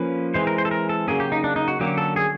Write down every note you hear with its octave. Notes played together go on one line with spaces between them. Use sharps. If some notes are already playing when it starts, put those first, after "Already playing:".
Already playing: F3 A#3 C#4 B4
E3 G#3 C4 C5
A#4
C5
A4
A#4
A4
C#3 F#3 A#3 C#4 G#4
G4
D#4
D4
D#4
F#4
D3 F#3 A#3 C#4 G4
A4
G#4